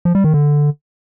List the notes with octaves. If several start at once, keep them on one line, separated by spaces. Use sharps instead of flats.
F3
G3
D#3
D3